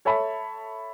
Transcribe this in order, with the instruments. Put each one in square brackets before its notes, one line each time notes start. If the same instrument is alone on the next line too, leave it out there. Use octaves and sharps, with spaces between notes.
[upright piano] A4 C#5 E5 A5 B5